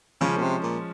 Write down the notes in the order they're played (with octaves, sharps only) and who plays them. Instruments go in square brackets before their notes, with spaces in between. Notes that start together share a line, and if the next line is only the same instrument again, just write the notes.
[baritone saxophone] C#3 [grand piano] F3 G#3 C#4
[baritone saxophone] A#2
C3
A#2